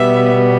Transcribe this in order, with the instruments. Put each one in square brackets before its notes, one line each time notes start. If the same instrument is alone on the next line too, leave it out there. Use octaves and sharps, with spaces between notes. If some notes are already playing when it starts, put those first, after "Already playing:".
Already playing: [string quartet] B2 G3 B3 E5